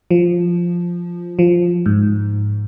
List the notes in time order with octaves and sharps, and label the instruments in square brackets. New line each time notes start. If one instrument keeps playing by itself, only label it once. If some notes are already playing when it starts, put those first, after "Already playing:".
[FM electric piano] F3
F3
G#2